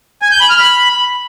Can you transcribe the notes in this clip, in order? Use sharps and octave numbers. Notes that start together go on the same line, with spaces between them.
G#5
G6
B5
F6
B5